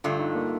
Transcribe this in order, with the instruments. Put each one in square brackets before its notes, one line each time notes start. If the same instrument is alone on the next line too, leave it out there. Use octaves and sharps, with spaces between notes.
[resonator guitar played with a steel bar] G2 D3 A3 [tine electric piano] F4
[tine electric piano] D#4
A#3